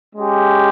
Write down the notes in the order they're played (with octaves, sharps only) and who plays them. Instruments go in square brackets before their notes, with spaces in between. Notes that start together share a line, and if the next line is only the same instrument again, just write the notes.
[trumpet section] G#3 C#4 G4